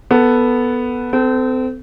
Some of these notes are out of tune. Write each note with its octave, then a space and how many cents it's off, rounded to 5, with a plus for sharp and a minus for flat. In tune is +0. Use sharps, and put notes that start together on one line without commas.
B3 +0 A4 +10
C4 -35 A4 +0